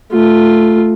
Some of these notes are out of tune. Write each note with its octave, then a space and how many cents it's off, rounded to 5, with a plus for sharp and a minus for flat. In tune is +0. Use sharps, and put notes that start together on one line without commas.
A3 +0 F4 +0